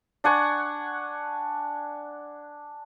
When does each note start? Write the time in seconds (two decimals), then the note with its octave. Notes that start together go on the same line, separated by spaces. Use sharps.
0.24 D4 F#5 G#5 C#6